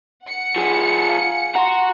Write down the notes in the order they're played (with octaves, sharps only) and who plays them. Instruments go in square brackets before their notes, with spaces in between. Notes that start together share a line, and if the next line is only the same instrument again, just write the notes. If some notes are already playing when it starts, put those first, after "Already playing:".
[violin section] F#5 C#7
[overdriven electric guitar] F3 G#4
[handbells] F5 G#5
[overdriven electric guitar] F#4 F#5 [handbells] A#5 C6